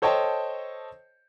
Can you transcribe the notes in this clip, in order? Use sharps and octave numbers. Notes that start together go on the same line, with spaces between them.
A4 C5 C#5 D#5 G5 A5